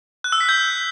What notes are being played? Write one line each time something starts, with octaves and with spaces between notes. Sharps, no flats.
F#6
E6
B6
G6